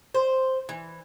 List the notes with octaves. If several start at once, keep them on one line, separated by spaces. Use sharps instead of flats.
C5
E3